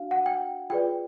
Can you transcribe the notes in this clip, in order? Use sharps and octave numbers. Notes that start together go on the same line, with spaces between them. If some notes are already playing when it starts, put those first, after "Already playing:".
Already playing: D4 F#4 F5
F#5
G5
F4 G#4 B4 D5 G5